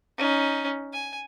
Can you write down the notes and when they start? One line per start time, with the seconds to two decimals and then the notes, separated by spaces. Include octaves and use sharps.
0.18 C#4 D#4
0.93 G#5